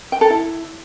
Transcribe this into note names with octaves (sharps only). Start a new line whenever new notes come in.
G5
A4
E4